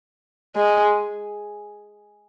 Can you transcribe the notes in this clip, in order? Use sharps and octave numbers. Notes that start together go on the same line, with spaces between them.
G#3